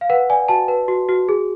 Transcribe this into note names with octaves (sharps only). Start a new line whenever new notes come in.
F5
B4 F#5
D5 G#5
F#4 A5
B4
F#4
F#4
G#4